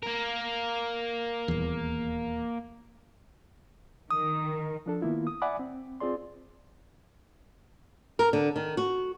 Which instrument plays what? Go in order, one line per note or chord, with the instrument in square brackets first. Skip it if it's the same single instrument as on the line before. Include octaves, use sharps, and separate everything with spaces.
[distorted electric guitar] A#3 A#4
[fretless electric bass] D#1 E2
[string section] D#3 [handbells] D#6
[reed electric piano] F3 D4 A4
D#3 A#3 B3 E4 F4
D#6
D5 E5 F#5 G#5 B5 D6
C4
C4 F4 G#4 D5 C6
[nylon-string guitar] A#4
D3
D#3
F#4